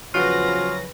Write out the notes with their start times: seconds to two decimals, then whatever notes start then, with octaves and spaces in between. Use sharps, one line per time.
0.14 E2 C#3 F3 F#3 F4 F#4 B4 A#6